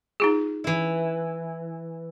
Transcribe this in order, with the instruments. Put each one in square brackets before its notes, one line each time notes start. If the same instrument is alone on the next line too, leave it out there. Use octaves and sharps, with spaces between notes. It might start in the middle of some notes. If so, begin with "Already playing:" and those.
[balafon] D#4 F4 G#4
[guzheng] E3 E4